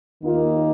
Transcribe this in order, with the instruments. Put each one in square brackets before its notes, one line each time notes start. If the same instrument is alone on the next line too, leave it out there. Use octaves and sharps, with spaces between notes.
[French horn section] D#2 D#3 A#3 D#4 F4